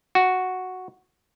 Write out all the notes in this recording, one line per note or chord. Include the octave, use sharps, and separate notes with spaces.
F#4